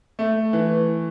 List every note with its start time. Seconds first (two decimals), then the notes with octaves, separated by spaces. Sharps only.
0.19 A3
0.53 E3